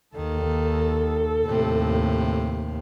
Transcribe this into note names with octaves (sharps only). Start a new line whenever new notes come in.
D#2 D#3 A4
D#2 A2 C3